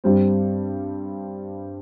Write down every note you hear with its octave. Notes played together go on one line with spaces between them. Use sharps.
G2 G3 C4